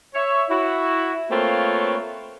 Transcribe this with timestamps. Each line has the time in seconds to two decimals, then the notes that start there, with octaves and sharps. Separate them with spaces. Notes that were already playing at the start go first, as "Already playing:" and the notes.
0.15 C#5 E5
0.50 E4 F#4
1.31 A3 A#3 C4 F4 B4 C#5